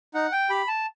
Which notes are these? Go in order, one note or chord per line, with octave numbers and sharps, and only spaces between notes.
D#4 F#5
G5
G4 B5
A5